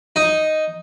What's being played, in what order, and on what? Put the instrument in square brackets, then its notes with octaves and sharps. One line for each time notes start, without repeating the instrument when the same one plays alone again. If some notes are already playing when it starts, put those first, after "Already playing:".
[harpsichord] D#4